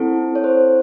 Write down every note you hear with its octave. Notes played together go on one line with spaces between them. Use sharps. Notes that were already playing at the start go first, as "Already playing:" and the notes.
Already playing: C4 E4 A4
C#5
C5